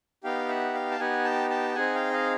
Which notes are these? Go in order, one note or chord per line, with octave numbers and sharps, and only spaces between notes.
B3 D#4 G4 F5 G5
E5 F#5
F5 G5
A5
B3 D#4 G4 F#5 G#5
G5 A5
G5 A5
C4 D#4 G#4 F#5 G#5
F5 G5
D#5 F5